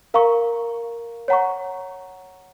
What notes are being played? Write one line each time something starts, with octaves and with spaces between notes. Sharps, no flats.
A#4 F5 A#5 C#6
C#5 F#5 A#5 C#6